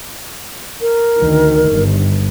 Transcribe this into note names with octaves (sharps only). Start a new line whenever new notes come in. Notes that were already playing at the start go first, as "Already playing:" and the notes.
A#4
D2 D#3
G1